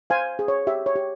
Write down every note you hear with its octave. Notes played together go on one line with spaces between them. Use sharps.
C5 F5 G#5
G#4
C#5
G4 E5
C#5
G4